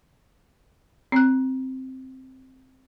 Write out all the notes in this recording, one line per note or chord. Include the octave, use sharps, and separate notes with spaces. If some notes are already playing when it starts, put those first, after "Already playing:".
C4 F#6